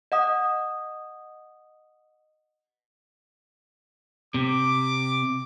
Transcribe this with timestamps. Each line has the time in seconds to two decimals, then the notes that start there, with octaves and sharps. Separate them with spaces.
0.12 D#5 F#5 D#6
4.34 C3 D6